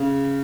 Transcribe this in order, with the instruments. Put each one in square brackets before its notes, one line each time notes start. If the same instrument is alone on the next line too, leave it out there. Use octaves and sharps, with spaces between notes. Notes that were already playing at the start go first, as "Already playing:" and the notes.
Already playing: [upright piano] C#3